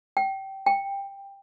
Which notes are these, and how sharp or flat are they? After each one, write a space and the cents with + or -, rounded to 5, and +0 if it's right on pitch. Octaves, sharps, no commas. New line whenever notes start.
G5 -20
G5 +10